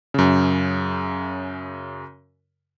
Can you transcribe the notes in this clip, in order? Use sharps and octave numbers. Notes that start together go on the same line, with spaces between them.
F#2 C#3